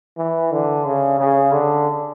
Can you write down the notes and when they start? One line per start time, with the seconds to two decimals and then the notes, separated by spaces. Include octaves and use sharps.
0.18 E3
0.52 D3
0.86 C#3
1.19 C#3
1.52 D3